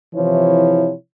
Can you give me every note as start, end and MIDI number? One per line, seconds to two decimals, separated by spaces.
0.14 0.92 48
0.14 0.92 52
0.14 0.92 53
0.14 0.92 64
0.14 0.92 73